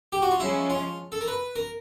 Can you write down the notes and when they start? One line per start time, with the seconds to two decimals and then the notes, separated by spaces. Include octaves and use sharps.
0.12 G4
0.22 F#4
0.31 F4
0.40 F3 G#3 C#4 E4
0.70 F4
1.12 A4
1.21 A#4
1.28 B4
1.56 A#4